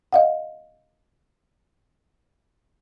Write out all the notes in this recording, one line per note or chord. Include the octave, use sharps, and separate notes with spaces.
D#5 F5 F#5